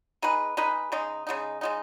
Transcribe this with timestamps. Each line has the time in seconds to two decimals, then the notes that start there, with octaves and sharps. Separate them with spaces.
0.22 G#3 D#4 G#4 B4
0.57 G#3 D#4 G#4 B4
0.92 C#3 G#3 D#4
1.27 C#3 G#3 D#4
1.61 C#3 G#3 D#4